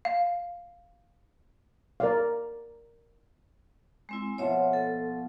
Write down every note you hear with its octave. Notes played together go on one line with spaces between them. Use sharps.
F5
A#4 D5 F5
G#3 C4 E4
B2 F3 F4 C#5 E5
A4